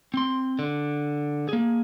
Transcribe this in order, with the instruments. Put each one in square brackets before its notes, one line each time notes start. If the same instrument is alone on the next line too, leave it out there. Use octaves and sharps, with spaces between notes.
[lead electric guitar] C4 C6
D3
A#3 G#4